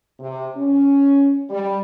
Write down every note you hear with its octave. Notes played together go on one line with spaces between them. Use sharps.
C3
C#4
G3